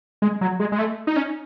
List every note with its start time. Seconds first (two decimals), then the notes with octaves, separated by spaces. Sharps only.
0.22 G#3
0.41 F#3
0.60 G#3
0.72 G#3
0.79 A3
1.07 D#4
1.16 C#4